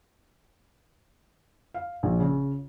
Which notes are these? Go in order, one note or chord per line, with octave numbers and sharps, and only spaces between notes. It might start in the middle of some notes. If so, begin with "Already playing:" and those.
F5
A#1
C#3